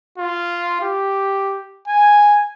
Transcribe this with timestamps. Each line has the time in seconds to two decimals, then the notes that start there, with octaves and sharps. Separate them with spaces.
0.18 F4
0.81 G4
1.88 G#5